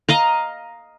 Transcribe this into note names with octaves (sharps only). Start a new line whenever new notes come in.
D#5 F5 A#5